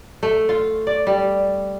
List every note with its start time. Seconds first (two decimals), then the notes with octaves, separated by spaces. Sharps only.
0.23 A3
0.49 F4
0.87 D5
1.07 G3